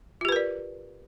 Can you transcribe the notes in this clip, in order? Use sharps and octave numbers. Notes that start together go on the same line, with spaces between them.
F4 G4 A#4 B4 D5